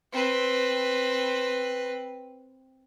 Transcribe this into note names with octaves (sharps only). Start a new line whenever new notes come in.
C4 B4